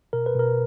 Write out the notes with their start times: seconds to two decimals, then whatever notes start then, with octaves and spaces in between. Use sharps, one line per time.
0.13 B2 A#4
0.26 B4
0.35 B2 A#4